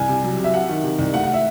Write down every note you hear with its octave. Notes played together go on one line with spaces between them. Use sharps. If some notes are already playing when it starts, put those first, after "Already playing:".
Already playing: C2 G#5
C3
F#3
C3
E5
C3 F#5
D#3
C3
C2
A3 F#5
F#5
E5